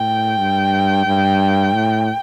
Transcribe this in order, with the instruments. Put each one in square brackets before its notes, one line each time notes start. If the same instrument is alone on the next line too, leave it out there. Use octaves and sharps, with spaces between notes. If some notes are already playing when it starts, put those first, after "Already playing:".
Already playing: [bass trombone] A2 [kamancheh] G5
[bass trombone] G2
G2
A2